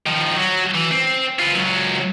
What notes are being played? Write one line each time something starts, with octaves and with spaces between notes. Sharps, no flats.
D#3 F3
F#3
E3
C4
F4 B4
C#2 F#3